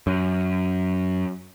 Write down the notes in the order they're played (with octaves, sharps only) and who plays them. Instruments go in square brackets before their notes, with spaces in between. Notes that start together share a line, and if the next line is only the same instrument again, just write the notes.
[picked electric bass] F#2